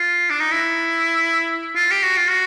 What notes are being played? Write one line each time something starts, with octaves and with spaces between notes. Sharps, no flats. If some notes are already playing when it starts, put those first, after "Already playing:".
Already playing: F4
D4
D#4
E4
F4
G4
F#4
F4
F#4